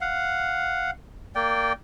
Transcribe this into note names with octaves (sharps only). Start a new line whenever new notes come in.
F5 F#5
A#3 D5 G5